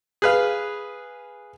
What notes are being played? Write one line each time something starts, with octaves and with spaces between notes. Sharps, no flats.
G#4 B4 F5